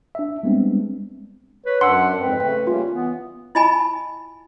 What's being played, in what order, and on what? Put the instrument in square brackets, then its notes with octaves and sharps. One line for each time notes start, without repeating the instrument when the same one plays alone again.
[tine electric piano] D4 E5
G3 G#3 B3 C4 D4
[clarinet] B4 [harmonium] C#5
[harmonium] F#2 D4 [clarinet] F#5 [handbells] C6 E6
[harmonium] F2 G#2 C4 [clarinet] B4
[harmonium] C#3 A3 [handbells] G5
[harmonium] G3 A#3 C#4 [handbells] F4
[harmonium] E3 [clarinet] B3
[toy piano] E4 F4 D#5 G#5 A5 B5